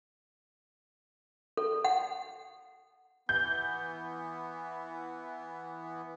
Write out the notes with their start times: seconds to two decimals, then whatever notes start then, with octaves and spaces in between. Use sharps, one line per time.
1.57 A4
1.84 F#5
3.29 E3 B3 G6